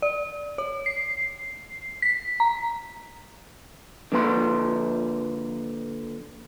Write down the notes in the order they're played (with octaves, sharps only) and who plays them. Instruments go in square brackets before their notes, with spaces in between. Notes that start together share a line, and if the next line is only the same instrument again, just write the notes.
[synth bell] D5
C#5
C7
B6
A#5
[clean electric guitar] D3 F3 A#3 B4 G5 C6